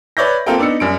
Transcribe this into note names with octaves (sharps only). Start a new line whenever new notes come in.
B4 C#5 D5 E5 G6 A#6
A#3 C4 F4 A4 A#4 G5
B3 D4 D#4 E6 C#7
F#2 G3 D7